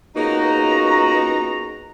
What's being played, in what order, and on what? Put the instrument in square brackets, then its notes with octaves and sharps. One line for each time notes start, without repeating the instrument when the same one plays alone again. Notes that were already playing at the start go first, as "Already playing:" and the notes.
[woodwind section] C#2 F#4 A#5 [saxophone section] A#3 B3 D#4